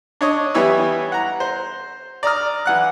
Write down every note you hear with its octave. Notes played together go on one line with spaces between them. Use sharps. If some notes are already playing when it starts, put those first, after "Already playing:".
D4 C#5 D#5
E3 G3 B3 E4 C#5 E6
F#5 A#5
C5
D5 A#5 D#6 F6
E3 F#5 F#6